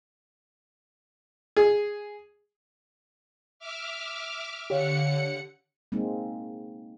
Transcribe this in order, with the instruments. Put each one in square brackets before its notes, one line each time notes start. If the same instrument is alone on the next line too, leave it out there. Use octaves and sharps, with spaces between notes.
[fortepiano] G#4
[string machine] E5 D6 F6
[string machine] D3 F#5 C#7 [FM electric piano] G4 C#5 F5
[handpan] G#3 A#3 C4 D#4